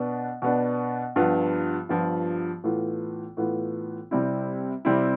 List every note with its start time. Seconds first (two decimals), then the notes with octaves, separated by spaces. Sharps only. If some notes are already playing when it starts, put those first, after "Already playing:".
Already playing: B2 B3 D4
0.42 B2 B3 D4
1.16 G2 F3 B3 F4
1.89 G2 F3 B3 F4
2.64 A2 E3 B3 F4
3.37 A2 E3 B3 F4
4.11 C3 G3 C4 E4
4.85 C3 G3 C4 E4